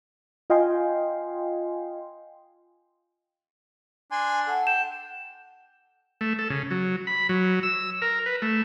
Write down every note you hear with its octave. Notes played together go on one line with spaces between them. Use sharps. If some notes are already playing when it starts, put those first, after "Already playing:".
F4 D#5 F5 G5 G#5 C6
D4 G#5 C6
A4 F#5
G5 E7
A3
A4
C#3
F#3
B5
F#3
E6
A#4
B4
A3